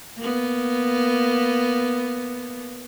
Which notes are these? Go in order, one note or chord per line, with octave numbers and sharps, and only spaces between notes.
A#3 B3